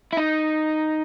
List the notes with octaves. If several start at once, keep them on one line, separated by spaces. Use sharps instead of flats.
E4
D#4